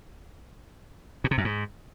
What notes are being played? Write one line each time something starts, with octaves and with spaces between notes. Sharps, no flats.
A#2
C3
F#2
G#2